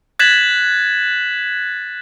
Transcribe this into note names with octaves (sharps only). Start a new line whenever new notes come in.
F#6 G#6 A6 B6 E7 F#7